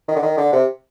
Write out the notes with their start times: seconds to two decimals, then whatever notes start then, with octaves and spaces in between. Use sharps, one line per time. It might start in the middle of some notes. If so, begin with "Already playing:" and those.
0.08 D#3
0.16 D3
0.22 D#3
0.37 D3
0.53 C3